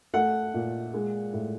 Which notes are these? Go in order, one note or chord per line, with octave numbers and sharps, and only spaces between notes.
A3 F#5
A#2
G#3
A2